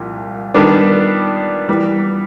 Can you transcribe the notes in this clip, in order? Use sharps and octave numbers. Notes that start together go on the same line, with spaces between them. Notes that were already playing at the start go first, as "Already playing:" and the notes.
Already playing: C2 A#2 F3
D#3 G3 B3 D4
E3 G3 B3